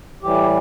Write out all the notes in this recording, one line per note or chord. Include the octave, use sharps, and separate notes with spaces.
A2 E3 G3 G4